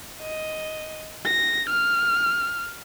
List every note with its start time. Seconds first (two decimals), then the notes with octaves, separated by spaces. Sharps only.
0.22 D#5
1.25 A#6
1.69 F6